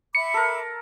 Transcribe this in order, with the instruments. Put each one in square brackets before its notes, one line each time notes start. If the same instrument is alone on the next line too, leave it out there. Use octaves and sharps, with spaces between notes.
[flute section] E5 B5 D6 [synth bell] C#7
[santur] A4 A#4